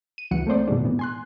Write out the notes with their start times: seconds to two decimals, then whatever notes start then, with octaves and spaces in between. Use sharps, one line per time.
0.18 D#7
0.31 C#2 E3 F#3 F#5 C#7
0.47 A3 A#3 C4 C5 D5
0.68 F#2 B2 D#3 G#3 D4
0.83 A2 C3 E3 B3
0.99 G#5 C6 F#6